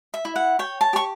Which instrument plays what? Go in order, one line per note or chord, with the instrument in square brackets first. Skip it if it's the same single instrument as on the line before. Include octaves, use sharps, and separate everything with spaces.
[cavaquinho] E5
E4
F#5
C#5 G5
A5
G4 C#6